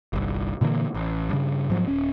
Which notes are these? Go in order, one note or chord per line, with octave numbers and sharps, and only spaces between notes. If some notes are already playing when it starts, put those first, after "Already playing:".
G1 C2
A#2 D3 E3 A#3
A1
G2 C#3
G#2 F3 F#3
D#1 C#4